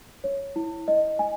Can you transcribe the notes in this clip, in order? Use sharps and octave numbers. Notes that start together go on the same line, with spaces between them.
C#5
E4
D#5
G#5